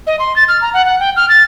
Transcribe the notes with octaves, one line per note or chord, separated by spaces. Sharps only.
D#5
C6
A6
F6
A#5
F#5
F#5
G5
F6
A6